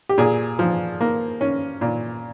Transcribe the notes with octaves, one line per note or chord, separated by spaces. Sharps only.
G4
A#2 G#4
F3
A#3
C#4
A#2